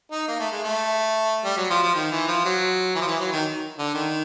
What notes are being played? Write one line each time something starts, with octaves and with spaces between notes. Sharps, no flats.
D#4
A#3
A3
G#3
A3
G3
F#3
F3
F3
D#3
E3
F3
F#3
E3
F3
E3
F#3
D#3
D3
D#3